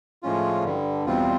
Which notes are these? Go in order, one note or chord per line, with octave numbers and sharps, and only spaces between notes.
A2 F3 G#3 C#4 F4
G2 D3 G3
E2 B2 G3 C4 F4